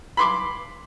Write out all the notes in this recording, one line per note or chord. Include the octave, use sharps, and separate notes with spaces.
B5 C6 D6